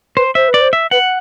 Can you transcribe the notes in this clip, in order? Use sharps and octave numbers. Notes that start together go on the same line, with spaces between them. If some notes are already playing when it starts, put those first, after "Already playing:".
B4 C5
C5 E5
B4
D5
C5
E5
B4 F#5